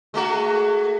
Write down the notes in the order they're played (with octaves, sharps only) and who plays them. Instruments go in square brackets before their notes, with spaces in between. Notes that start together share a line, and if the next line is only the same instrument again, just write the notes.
[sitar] G#3 A3 F#4